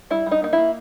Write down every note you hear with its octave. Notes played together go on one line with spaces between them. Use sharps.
G3 E4
G3
D#4
A#3 D#4
E4
A#3